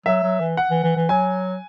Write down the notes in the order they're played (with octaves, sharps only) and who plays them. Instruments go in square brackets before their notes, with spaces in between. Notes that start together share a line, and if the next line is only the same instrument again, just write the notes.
[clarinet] F#3 [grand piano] E5
[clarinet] F#3
E3
[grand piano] F#5
[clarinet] E3
E3
E3
[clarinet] F#3 [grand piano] G#5